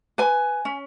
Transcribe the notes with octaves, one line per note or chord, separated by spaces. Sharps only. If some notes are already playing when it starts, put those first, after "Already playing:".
B4 G#5
C#4